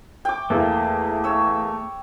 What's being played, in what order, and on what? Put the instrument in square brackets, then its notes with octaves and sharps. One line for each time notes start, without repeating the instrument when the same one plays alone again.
[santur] G5 D6
[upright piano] E2 A#3 [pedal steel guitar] A3
[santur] C#5 E6